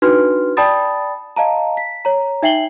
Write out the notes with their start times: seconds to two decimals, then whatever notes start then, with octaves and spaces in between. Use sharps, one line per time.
0.02 D4 D#4 F#4 B4 C6 F6
0.57 D5 G5 A5 B5 D#6 A6
1.36 D#5 F5 A5 A#5
1.77 B6
2.05 C#5 A#5
2.43 D#4 E5 G5 C7 F#7 G7